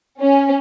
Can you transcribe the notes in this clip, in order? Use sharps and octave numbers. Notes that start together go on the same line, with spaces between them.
C#4